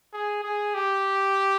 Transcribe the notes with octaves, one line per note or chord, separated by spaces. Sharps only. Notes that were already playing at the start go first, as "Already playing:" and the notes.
G#4
G#4
G4